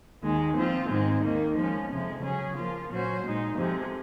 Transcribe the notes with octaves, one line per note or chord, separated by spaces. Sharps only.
D#2 D#3 G#3
F3 C4 F4
G#2 D#3 G#3 C4
D#2 D#3 A#3 D#4
F3 G#3 C#4
F2 C3 F3 G#3
C#3 F#3 C#4 G#4
F3 A#3 F4
A#2 F#3 C#4 F#4 C5
A#2 G#3 D#4
F2 C3 F3 G#3